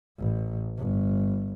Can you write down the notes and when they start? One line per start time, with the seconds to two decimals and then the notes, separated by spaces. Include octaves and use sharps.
0.19 A1
0.78 G1